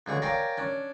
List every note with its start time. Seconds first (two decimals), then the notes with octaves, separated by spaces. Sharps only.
0.06 C#2 D3 G#4 C#6
0.22 A#4 C#5 D5 F5 G5 G#5
0.57 C#4 D4